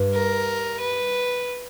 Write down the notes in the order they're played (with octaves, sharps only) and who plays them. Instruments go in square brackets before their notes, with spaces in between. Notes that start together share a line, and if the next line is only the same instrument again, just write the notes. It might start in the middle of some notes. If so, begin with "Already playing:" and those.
Already playing: [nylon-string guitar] G2
[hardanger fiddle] A#4
B4